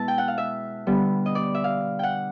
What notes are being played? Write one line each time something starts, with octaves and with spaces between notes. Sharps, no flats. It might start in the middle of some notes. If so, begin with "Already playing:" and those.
Already playing: B2 G#3 B3 E4 E5 A5
G5
F#5
F5
E5
D3 G3 B3
D#5
D5
E5
F5
F#5 G5